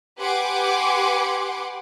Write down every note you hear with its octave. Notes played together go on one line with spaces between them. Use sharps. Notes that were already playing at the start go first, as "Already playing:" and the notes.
G4 B4 F#5 G#5 C6 D6